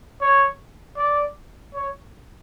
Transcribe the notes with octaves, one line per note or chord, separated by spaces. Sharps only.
C#5
D5
C#5